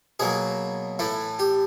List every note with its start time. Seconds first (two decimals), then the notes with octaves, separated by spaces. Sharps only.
0.20 B2 F#3 A#3 G#4
0.99 A2 E3 A3
1.39 G4